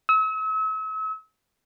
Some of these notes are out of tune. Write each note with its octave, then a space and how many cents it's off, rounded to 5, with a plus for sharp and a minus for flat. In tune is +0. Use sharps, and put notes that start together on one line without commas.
E6 -40